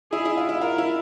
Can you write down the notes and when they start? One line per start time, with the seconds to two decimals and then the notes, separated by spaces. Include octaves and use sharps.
0.12 E4 G#4
0.25 E4
0.37 F4
0.49 E4
0.61 F4 A#4
0.78 E4